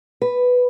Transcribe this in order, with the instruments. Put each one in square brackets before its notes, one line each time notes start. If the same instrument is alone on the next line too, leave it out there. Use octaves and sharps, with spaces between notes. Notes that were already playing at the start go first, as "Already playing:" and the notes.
[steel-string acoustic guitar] B4